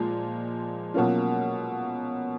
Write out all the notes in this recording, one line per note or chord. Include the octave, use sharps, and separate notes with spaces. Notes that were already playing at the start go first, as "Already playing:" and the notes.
Already playing: A#2 F3 G#3
B2 F#3 A#3 C#4 F4